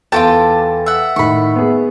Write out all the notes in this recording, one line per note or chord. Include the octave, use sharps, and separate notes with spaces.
E2 F4 F#4 A4 G5 A5 D6 A6
E5 F#5
A2 D#3 B5 C#6
B3 G#4